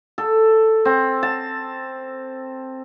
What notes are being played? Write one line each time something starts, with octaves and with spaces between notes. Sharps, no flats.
A4
C4
A5